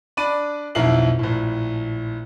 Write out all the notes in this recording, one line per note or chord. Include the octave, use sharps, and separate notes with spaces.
D4 D5 B5 D#7
B1 F2 E4 A#4 C7 F#7
A#1 A2